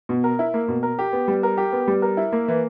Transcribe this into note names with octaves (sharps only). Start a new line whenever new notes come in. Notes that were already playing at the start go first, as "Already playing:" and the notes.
B2
A#4
E4
A#3
B2
A#4
G4
B3
G3
A#4
G4
B3
G3
A#4
E4
A#3
E3